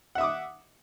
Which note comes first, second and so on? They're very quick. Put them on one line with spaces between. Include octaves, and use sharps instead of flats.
F#5 E5 D#6 D6